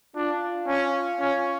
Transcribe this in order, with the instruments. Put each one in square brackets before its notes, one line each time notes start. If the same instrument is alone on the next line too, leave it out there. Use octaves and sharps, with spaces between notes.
[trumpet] D4 [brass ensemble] F4
[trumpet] C#4
C#4